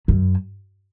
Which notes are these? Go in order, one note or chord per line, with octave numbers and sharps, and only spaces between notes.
F#2